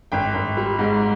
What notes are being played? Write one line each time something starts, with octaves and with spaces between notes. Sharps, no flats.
G#1 G5
G#1
G3
G#2